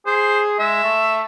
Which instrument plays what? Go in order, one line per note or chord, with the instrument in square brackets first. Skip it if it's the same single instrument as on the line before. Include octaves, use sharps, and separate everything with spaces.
[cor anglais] G#4 [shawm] C5
[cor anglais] G#3 [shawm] E5
[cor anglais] A3